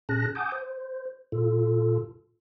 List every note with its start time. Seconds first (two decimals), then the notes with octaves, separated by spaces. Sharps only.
0.09 A#2 C#4 G#4 A5 F#6 A#6
0.35 F#5 G#5 A5 D6 D#6 G6
0.52 C5
1.32 A#2 F4 A4